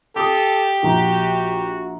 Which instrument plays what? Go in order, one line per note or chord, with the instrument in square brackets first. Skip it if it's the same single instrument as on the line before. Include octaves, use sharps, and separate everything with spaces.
[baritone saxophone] G4 [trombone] A4 [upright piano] D6 D#6
[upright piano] A#1 A#5 [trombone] F#4